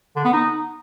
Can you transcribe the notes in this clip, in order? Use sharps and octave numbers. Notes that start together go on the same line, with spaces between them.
D3
B3
D#4